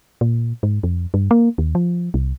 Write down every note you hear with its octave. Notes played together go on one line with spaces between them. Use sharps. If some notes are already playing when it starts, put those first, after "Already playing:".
A#2
G#2
F2
G2
A#3
D#2
F3
C2